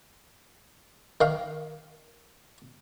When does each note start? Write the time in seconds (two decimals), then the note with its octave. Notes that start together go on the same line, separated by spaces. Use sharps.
1.21 D#3 F5